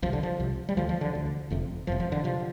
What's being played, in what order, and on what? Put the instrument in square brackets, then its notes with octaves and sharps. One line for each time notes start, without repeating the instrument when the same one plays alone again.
[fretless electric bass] C2 C3 F3
D3
F3
C2 C3
G3
D2 D3 F3
F3
D3
D2 D3
F1 F2 C3
F1 F2 C3 F3
F3
D3
C3 F3